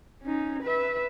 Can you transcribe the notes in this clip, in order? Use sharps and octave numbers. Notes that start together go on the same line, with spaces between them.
C#4 D#4
B4 E5